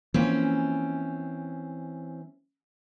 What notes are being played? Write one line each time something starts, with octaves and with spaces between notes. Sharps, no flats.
E3 F3 A#3 C4 C#4